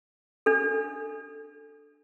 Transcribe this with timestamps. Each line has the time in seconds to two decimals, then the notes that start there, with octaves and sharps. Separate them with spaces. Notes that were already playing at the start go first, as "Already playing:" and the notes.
0.46 D4 A4